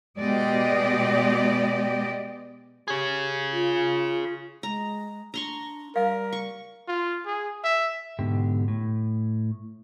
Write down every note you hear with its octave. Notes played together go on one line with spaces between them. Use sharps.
B2 G#3 G4 D5 D#5
G4 G#4 C#5
F4
G#3 A#5
D4 A#5 C6 C#6
G3 A#4 F5
C#6
F4
G#4
E5
G#2 B2 D3 G4
A2